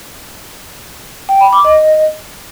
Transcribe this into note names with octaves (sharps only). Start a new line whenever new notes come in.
G5
B5
D6
D#5